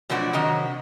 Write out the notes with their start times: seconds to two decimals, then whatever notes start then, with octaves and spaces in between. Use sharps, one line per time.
0.10 B2 F3 F#3 A3 D4 F#4
0.33 C3 D#3 F#3 D#5